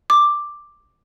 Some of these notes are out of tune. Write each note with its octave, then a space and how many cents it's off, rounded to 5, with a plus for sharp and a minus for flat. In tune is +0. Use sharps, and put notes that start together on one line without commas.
D6 +5